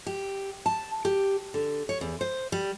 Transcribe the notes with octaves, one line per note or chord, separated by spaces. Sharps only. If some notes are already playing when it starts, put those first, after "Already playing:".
G4
A5
G4
D3
C#5
E2
C5
G3